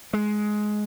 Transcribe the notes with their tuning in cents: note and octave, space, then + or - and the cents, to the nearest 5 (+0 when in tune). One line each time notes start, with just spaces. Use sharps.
G#3 +15